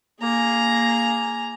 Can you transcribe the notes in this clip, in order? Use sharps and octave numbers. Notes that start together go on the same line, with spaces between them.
A#3 G#4 A#5